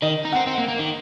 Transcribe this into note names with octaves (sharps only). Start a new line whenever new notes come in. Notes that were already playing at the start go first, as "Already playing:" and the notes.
D#3 D#5
D#4
C4 F#5
C4
A#3
A#3
D#3